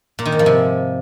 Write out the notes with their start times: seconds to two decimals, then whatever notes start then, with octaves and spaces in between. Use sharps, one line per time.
0.19 A#2
0.26 D#3
0.32 G#2
0.39 F3
0.46 C3